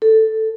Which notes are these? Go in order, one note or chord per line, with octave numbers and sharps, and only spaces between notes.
A4